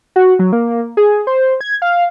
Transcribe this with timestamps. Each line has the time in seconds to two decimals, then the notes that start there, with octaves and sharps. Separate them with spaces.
0.16 F#4
0.39 F#3
0.53 A#3
0.97 G#4
1.27 C5
1.61 G#6
1.82 F5